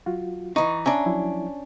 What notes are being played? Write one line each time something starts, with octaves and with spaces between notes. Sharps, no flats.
F#3 F4 F#4
E3 D#4 C#6
C#4 D4 E5 A#5
F3 F#3 E4